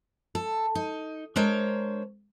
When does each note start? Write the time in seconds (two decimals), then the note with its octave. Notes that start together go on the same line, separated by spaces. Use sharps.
0.35 A4
0.75 D#4
1.36 G#3 D4 A#4 C5 C#5